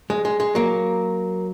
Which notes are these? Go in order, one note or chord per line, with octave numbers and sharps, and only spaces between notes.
G#3
G#3
G#3
F#3 A#3